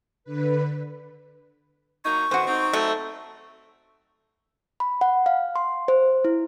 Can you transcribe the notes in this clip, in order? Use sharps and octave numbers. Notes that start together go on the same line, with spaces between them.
D3 B4
F#3 A#3 D#4 C#6
F2 B2 E3 F#4 C5
C4 D#4
F#3 A3
B5
F#5
F5
C6
C5
E4